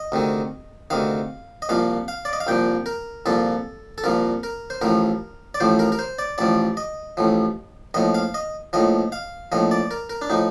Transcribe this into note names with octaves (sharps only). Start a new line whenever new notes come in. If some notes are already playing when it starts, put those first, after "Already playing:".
Already playing: D#5
D2 C3 D#3
D2 C3 D#3 F5
D#5
C2 A#2 F3 F5
F5
D5
D#5
F5
C2 A#2 F3 G5
A#4
C2 A#2 F3 A4
A4
C2 A#2 F3 A#4
A#4
C5
A1 A2 F3 A#4
D5
A1 A2 F3 C5
A#4
A#4
C5
D5
A1 A2 F3 D5
D#5
A1 A2 F3
A#1 A2 F3 D#5
F5
D#5
A#1 A2 F3 D#5
F5
A#1 A2 F3 D#5
D5
A#4
A#4
D4
A2 F3 D#4